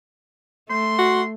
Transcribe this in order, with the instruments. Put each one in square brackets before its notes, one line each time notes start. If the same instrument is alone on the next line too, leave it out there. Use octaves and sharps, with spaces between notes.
[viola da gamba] A3 [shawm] C6
[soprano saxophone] F#4